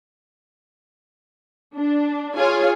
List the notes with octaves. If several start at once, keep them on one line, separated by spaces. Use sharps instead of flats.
D4
F4 G#4 C#5 G#5